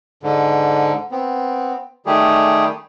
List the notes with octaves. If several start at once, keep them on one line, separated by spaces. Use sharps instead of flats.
G#2 D3
B3 C4
D#3 G3 A3 G4 G#4